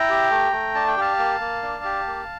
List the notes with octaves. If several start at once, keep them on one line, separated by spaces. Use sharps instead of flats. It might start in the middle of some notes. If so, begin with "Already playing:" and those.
Already playing: E4 G5 A#5
G4
A3
A3
D4 A5
G5
G4 F5 A5
A#3
A#3
D4
G4
A#3